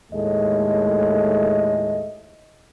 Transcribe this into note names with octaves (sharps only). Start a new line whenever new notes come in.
D#2 A2 G#3 A3 D#5